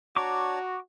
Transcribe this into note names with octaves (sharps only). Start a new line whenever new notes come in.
D4 F#4 C#5 D5 A#5 C#6 D6